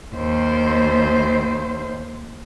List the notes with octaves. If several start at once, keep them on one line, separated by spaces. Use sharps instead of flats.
D#2 C5